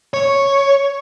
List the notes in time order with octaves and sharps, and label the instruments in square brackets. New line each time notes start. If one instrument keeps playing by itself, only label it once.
[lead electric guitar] C#5